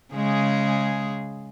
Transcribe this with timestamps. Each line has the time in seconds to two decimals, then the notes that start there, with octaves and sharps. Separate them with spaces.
0.14 C#3 G#3 G#4